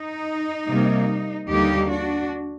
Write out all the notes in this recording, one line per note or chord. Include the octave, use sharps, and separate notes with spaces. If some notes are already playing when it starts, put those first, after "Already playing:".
Already playing: D#4
C3 G3 A#3
D#2 D3 G3 A#3 D#4 G4
D4 F#4